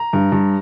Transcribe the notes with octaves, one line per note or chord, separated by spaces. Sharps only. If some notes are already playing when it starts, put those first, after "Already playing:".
Already playing: A#5
G2
G2